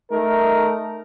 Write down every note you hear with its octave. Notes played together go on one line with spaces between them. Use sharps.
A3 D#4 A#4